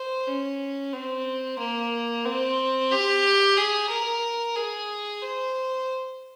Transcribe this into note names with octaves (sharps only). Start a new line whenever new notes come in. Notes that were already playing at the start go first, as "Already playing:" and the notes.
Already playing: C5
C#4
C4
A#3
C4
G4
G#4
A#4
G#4
C5